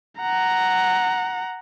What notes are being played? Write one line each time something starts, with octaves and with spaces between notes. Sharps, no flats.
F#5 A#5